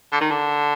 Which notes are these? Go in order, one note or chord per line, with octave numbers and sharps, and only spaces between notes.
D3
D#3
D3